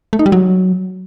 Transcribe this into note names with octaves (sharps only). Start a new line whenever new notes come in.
A3
D#4
G3
F#3